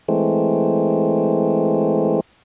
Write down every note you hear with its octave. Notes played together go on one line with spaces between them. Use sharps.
E3 G#3 A3 C4